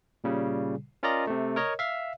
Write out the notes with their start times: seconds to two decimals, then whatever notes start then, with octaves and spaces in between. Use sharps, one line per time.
0.24 A#2 C#3 G3
1.03 C#4 F4 A#4 D5 D#5 A#5
1.27 C3 A3
1.56 A#4 C#5 D#5
1.79 E5 F5